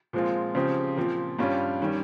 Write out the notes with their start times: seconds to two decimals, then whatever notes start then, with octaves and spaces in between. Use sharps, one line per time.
0.13 A#2 F3 G#3 C4 F4
0.55 C#3 F3 C4 G4
0.97 A#2 F3 C4
1.38 G2 G3 C#4 F4
1.82 D#3 G3 C#4